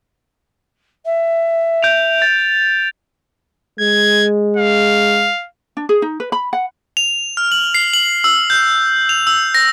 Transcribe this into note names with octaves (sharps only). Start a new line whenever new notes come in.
E5
G6 D7 F7
A6
G#3 G#6
F5
D4
G#4
D#4
B4
B5
F#5
F7
F6
F#7
C7
F#7
E6
G6
F7
E6
A#6